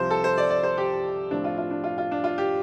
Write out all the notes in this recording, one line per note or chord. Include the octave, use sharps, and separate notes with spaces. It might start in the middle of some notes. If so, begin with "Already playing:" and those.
Already playing: C2 C3 F3 C5
A4
C5
D5
D5
C5
G4
A2 F3 C4 D4
F4
F4
D4
F4
F4
D4
F4
G4